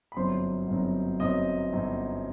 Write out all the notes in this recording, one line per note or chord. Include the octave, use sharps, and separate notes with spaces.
B5
G1 F#2 F#3 C4 D#4 C5 C6
G1 F#2 F#3 C4 D#4
G1 F#2 F#3 C4 D#4 D#5 D#6
G1 F#2 F#3 C4 D#4